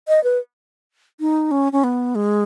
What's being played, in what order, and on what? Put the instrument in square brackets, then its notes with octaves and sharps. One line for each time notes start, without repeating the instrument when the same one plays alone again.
[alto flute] D#5
B4
D#4
C#4
C#4
B3
G#3